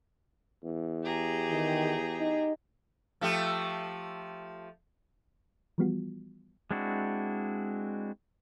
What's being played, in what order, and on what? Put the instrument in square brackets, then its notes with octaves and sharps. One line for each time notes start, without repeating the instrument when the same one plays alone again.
[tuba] E2
[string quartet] G4 G#4 A#5
[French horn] D#3
D#4
[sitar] F3 A3 G4
[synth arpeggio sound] E3 F3 G3 B3 F4 F#4
[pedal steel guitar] G#3 C4 D4 E4 F#4